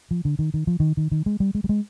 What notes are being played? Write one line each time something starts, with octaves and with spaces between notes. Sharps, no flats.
F3
D3
D#3
D#3
F3
D#3
D#3
D#3
G#3
G3
G#3
G3
G#3